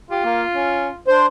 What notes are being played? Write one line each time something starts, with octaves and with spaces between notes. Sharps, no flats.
F4 G4
A#3
C#4
D4 C5